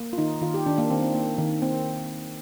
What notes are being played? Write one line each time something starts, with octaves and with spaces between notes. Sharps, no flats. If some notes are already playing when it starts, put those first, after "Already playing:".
Already playing: A#3
F4
D#3 D#4
D#3 F4
G4
D#3 D4
A#3
D#3 C4
C4
A#3
D#3
A#3 C4